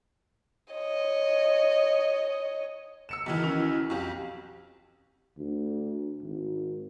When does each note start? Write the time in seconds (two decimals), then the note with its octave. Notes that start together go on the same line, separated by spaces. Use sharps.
0.73 C#5 D#5
3.09 E6 C#7 E7
3.26 B1 D#3 E3
3.43 C#4 E4
3.90 B1 F2 G4 F5 C#6
5.38 D2
6.23 G#1